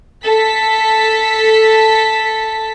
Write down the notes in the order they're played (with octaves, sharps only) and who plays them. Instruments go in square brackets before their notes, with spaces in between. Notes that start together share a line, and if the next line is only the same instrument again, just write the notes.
[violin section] A4 B6